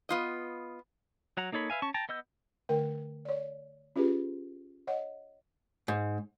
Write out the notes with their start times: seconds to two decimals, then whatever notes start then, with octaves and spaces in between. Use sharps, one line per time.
0.09 B3 F4 D#5
1.37 F#3 F#5 A#5
1.52 A#3 D#4 A4 C#5 B5
1.70 B4 E5 F5 G#5
1.82 C#4 A5 C#6
1.94 G5 A5 A#5
2.09 B3 D#5 E6 G6
2.69 D3 A3 A#4 G5
3.25 C#5 D5
3.96 C#4 F4 G4 G#4 B4
4.87 C#5 D#5 F#5
5.88 G#2